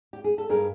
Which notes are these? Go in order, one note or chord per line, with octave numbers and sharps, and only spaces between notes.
G4
G#4
A4
G2 G#4 A#4